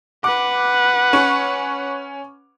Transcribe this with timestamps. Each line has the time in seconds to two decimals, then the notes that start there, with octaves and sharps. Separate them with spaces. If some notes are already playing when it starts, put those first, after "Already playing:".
0.24 B4 F#5 D6
1.13 C#4 C#6